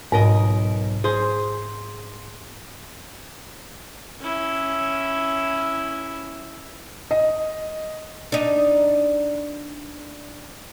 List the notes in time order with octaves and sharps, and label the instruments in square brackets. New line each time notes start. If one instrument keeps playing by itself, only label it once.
[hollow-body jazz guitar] B1 A#4 D#5 [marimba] G#2
[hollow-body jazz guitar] G#4 C5
[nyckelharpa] C#4 E4
[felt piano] D#5
[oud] D4 D#4